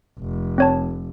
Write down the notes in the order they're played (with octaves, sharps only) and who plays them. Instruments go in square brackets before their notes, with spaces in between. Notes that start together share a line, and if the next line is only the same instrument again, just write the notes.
[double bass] F1
[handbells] C4 C#5 A5